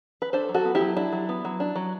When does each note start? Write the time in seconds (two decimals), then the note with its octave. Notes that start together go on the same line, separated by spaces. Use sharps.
0.22 B4
0.33 D4 A4 C5
0.49 F#3
0.54 F#4 A4
0.65 B3
0.75 E4 G4
0.81 F#3
0.97 D4 E4
1.13 F#3
1.29 B3
1.45 F#3
1.60 D4
1.75 F#3